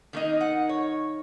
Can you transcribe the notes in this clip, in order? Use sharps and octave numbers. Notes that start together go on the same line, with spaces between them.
D#3 A#3 D#4
F#5
C#5